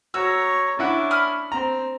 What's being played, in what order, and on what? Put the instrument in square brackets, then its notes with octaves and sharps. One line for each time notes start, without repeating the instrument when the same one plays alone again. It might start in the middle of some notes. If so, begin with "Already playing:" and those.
[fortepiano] F#4 [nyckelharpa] C#5 A#5 [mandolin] E6
[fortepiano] C#4 E4 F#5 [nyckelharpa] D4
[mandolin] B5 D#6 F6
[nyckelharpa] C4 [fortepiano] A#5